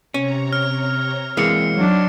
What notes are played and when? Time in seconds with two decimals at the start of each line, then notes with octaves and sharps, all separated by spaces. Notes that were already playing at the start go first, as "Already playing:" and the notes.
0.14 C3 C#4 C#5 A#5
0.53 F6
1.37 E3 G#3 A#3 C4 C7 C#7
1.76 F#3 D4 D#4 C6